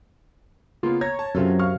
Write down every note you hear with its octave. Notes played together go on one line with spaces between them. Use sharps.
C#3 A#3 B3 F4
C#5 A#5 G#6 A#6
A5
F#2 C3 F#3 C#4 F4 A4
F5 C#6 F6